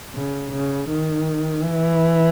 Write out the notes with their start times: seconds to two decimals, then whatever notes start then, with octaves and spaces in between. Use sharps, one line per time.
0.15 C#3
0.52 C#3
0.89 D#3
1.63 E3